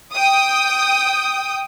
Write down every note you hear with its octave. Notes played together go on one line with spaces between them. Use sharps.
G5 D#6